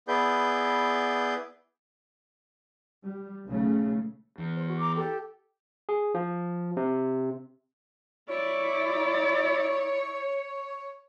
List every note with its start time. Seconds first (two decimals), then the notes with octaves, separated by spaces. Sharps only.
0.08 B3 E4 G#4 B4 D5 G6
3.03 G3
3.47 B1 C#3 A3
4.38 E2
4.56 C5
4.68 F#4
4.80 A#5 D6
4.96 G4 A4 G5
5.89 G#4
6.14 F3
6.77 C3
8.29 E4 C#5 D5